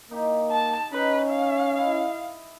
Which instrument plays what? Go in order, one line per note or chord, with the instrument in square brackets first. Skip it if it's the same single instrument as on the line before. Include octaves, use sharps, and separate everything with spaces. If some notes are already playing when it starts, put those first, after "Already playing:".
[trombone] A#3 [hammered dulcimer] D#4 G4
[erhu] A5
[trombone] C#4 [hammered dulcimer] D#4 [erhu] B4
[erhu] F5
[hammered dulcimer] E4 D#5